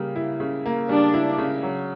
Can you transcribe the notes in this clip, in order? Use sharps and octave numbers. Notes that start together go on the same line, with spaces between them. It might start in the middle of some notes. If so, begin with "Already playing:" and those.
Already playing: C#3 G3 A#3
E4
C#3
A#3
G3 D4
E4
C#3
F#3